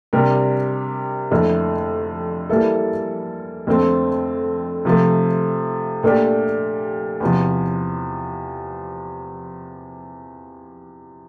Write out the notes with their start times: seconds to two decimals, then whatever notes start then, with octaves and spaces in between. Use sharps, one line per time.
0.13 C3 G3 D4 G4 A#4
1.31 F2 D3 A3 E4
2.50 E3 G3 A#3 E4 A4
3.67 F2 D3 A3 C4
4.85 C3 F3 A3
6.03 A#2 A3 D4 G4
7.20 E2 C3 F3